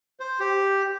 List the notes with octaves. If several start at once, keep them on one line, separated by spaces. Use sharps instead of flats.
C5
G4